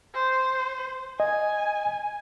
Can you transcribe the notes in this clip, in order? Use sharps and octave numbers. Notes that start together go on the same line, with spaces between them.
C5
D#5 G#5